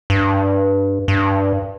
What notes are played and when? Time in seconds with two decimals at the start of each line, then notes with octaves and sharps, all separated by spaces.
0.10 G2
1.08 G2